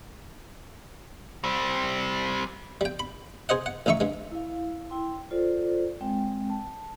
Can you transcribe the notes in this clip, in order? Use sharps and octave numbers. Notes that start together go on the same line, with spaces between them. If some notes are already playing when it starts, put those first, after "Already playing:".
G3 C4
G3 G5
B5
G#4 C5 D#5 F#5
F#5
A1 C#3 D#4 E5 C#6
G2 G#3
E4 F5
E4 G5 C6
F4 A4 C5 D5
G#3 C4 G5
A5